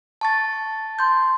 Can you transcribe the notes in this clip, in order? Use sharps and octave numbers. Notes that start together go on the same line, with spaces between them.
A5 C#6 A6
C6 G6